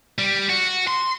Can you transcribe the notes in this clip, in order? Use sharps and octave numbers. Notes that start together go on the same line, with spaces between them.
G3
F#4
C6